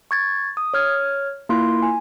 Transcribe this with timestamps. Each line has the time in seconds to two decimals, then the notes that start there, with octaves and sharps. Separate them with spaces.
0.11 C#6 G#6 A6
0.57 D#6
0.74 C#5 F6 G#6
1.49 A#3 E4 F4 C6
1.82 G#5